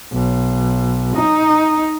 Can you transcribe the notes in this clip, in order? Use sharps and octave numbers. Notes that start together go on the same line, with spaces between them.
B1
D#4